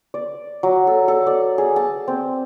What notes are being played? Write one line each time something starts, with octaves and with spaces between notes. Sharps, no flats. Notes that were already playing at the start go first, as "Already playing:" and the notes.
D5
F#3
A4
A4
D5
G#4
A5
C4